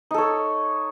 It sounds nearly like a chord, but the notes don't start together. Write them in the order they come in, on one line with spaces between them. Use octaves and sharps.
D#4 A4 C#5